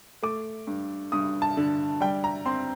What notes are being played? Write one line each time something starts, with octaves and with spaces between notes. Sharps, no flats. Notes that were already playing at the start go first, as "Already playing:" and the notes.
A3 D6
G2
G2 D#6
A5
D3
G3 G5
A#5
C4 C6